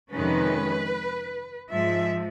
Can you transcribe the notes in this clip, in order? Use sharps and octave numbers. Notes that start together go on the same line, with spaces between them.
F2 C3 D#3 G#3 C#4 B4
G#2 F3 G#3 E5